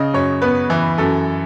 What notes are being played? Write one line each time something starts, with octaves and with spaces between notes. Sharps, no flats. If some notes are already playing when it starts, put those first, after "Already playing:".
Already playing: C#3 D#5
F#2 C#5
B3 B4
E3
F#2 A4